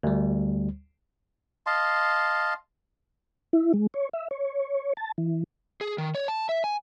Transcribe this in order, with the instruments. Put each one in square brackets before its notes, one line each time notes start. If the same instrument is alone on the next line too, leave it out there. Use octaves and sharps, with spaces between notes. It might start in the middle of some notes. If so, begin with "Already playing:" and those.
[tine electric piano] D2 G3
[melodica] D#5 F5 A5 C6
[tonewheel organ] E4
G#3
C#5
E5
C#5
A5
E3
[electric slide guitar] G#4
D#3
C#5
A5
E5
G#5